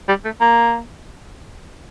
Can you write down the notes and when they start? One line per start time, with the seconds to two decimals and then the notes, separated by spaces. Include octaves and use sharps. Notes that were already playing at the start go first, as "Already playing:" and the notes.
0.08 G3
0.24 A3
0.41 A#3